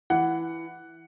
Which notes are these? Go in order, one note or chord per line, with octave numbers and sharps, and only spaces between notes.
E3 F#5